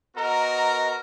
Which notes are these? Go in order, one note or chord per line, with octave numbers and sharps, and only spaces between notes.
B3 F#4 A#4 D#5 A#5